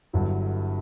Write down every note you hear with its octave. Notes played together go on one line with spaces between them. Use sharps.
G1 G2 D3 F#3 E4